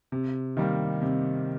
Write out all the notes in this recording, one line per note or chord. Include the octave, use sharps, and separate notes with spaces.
C3
D#3 G3 A#3
C3